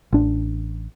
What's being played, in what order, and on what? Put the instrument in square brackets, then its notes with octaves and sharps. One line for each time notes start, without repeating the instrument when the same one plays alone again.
[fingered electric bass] A1 D4